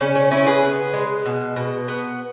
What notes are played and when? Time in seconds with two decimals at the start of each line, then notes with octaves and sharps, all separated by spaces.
0.01 C#3 C#4
0.15 C#4
0.31 C#3 C#4 E4
0.47 G#4 B4
0.63 B3
0.94 G#3
1.26 B2
1.56 B2
1.88 B3